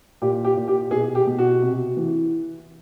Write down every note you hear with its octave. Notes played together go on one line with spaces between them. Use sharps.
A#2 G4
G4
A#2
G4
B2 G#4
G4
B2
F#4
C3
E3